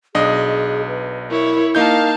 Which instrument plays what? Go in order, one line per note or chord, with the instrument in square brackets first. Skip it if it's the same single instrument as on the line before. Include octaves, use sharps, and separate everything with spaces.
[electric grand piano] B1 D4 D#5 [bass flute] G#4
[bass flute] B4
[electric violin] E4 C#5 [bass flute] A#4
[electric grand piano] A#3 D#4 G6 [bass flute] A#4 [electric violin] F5 A5